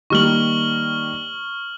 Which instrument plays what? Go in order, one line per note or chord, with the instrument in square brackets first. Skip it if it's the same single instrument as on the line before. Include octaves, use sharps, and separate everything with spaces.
[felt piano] D#3 G3 A#3 [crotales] C#6 F6 F#7